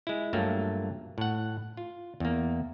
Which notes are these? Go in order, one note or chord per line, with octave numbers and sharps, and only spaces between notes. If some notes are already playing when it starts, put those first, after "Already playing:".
G#3 E4
G2 F#3 A3 A#3 F4
A2 F#5
F4
E2 A#3